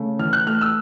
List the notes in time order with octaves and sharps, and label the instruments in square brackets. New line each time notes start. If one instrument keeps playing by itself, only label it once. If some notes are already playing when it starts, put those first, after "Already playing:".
Already playing: [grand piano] C#3 A3
E3 F6
F#6
A3 F6
E6